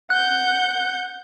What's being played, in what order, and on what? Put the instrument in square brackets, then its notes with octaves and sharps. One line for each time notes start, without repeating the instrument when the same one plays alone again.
[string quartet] F#5 G6 [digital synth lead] F#6